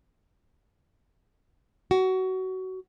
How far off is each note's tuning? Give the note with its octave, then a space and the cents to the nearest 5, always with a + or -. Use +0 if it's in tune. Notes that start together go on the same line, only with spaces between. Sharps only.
F#4 +20